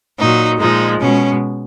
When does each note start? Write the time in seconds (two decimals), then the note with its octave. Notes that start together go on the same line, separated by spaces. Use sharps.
0.19 A#2 F#3 D#4
0.60 A#2 F3 G#3 D#4
1.00 B2 G#3 C#4